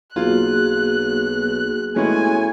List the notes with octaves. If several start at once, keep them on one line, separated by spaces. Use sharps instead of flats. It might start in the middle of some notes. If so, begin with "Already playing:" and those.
B1 A#3 F4 F#4 G#4 F#6
A2 G#3 B3 C#4 G#5